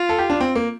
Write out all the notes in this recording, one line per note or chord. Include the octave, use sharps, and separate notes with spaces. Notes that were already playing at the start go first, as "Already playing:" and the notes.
Already playing: F4
A4
G4
D4
C4
A#3